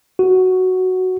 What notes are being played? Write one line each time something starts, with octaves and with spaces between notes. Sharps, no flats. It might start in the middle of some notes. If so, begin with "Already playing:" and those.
F#4